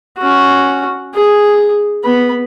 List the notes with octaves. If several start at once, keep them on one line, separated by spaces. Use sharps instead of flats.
C#4 F#4
G#4
B3 B5